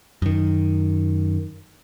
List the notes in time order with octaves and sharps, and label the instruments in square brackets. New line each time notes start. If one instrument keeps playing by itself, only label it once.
[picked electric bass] F#2 D#3